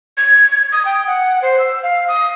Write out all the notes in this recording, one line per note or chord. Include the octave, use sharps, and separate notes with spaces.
G#6
D#6
G5
F#5
C5
E6
F5
D#6